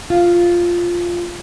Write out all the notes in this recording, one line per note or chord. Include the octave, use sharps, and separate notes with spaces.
F4 F5